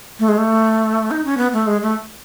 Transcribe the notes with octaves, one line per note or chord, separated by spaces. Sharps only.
A3
G#3
A3
D#4
C#4
B3
A3
G#3
A3